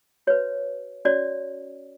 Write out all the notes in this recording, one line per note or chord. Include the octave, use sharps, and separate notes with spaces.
F#4 B4 C#5
C#4 F#4 C#5 D5